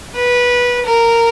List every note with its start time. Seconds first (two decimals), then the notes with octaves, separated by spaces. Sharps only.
0.16 B4
0.86 A#4